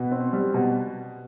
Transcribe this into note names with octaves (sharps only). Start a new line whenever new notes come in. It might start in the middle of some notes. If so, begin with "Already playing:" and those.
Already playing: B2 B4
C4
G3
B2